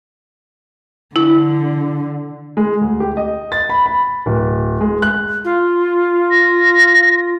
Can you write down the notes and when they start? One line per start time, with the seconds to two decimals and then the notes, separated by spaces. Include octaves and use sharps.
1.16 D3 E4
2.57 G#3
2.81 D2
3.00 G4
3.17 D#5
3.52 A6
3.69 B5
3.86 B5
4.26 D1
4.81 G#3
5.02 F#6
5.44 F4
6.31 A#6